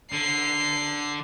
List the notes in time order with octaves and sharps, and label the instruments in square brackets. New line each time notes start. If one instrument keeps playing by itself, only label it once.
[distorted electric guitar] D3 [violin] C7